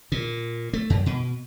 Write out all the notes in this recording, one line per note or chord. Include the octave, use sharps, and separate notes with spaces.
A#2
A3
F#2
B2